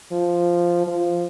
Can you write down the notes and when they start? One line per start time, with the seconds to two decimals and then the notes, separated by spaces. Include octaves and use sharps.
0.12 F3
0.87 F3